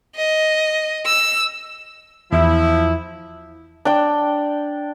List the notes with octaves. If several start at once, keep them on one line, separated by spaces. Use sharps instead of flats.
D#5
E6
E2 F3 E4
D4 G5